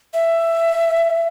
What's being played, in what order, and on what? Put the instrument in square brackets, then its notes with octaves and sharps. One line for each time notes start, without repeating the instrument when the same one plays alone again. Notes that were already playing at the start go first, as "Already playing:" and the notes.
[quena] E5